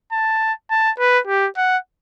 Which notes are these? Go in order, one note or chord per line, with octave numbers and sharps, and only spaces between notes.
A5
A5
B4
G4
F#5